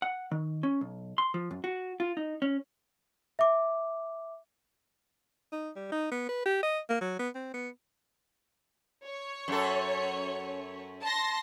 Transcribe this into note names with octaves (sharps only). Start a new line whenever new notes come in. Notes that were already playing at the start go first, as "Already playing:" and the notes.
F#5
D#3
C#4
B1
C6
F3
F#2
F#4
F4
D#4
C#4
E5 D6
D#4
G3
D#4
B3
B4
G4
D#5
A#3
F#3
B3
C4
B3
C#5
F#2 A4
A5 C6 A#6